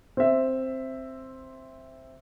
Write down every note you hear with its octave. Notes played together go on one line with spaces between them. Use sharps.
C4 E5